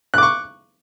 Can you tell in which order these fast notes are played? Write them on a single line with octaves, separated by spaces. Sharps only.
F#6 D6 C#6